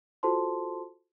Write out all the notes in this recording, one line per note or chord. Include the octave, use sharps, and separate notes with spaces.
F4 F#4 A4 C5 A5 C6